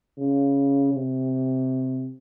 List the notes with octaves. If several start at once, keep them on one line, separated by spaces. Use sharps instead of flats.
C#3
C3